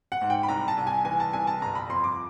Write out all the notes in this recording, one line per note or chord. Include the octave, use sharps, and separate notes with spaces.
F#5
G#2
G5
B5
C2 A#5
A5
C2
G#5
E3 G#5
A5
C2 G#5
A5
G1 A#5
B5
F2 C6
D6